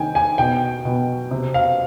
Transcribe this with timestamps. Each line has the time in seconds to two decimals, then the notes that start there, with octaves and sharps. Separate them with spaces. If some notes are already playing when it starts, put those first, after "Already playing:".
Already playing: C3 D#3 G5 G#5
0.15 G#5
0.38 B2 G5
0.85 B2
1.31 C3
1.54 F5